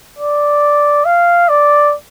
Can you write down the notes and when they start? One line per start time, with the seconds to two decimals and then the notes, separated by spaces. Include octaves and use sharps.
0.19 D5
1.05 F5
1.48 D5